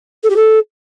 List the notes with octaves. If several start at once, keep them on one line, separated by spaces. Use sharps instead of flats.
A4
G4
A4